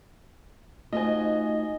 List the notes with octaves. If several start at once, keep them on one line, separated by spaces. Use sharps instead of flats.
A3 D#4 F4 F#4 C5 D#5 G#5